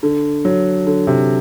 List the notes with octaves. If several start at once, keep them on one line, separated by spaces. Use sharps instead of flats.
D3
F#3
D3
C3